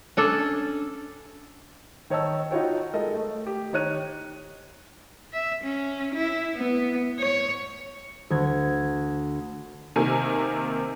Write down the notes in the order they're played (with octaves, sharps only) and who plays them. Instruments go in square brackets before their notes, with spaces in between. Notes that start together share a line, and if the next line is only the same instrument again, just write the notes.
[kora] C#4 D4 A4
[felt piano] D#3 C#5 D#5 A5 E6
D#4 F4 F#4 C#5 G5
G#3 A4 A#4 D#5
A3
G4
D#3 D#4 C#5 F#6 D#7
[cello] E5
C#4
E4
B3
C#5
[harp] D2 G#6
[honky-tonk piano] C3 D#3 A#3 G#5